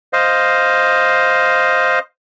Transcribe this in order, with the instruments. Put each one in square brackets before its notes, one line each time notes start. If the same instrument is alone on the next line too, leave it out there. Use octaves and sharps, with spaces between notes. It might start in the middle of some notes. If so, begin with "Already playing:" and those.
[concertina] C5 D#5 F5